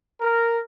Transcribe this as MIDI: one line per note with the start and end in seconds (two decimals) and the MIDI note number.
0.21 0.61 70